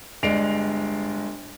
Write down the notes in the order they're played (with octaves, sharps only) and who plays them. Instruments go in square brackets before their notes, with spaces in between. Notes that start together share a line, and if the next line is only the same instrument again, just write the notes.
[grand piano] G1 G#3 D5 C7 D7 F7